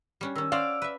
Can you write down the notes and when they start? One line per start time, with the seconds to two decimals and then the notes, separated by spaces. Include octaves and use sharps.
0.21 G3 C#4 D4
0.36 D#3 C#4 E6
0.52 C#4 F#4 C5 D5 F5
0.82 B4 E5